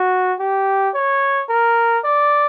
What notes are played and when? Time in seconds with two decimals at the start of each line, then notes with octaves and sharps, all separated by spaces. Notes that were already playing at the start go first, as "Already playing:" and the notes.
Already playing: F#4
0.40 G4
0.95 C#5
1.49 A#4
2.04 D5